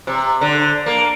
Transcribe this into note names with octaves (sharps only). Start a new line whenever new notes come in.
C3
D3
A#3